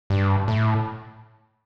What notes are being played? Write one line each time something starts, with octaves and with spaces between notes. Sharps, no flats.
G2
A2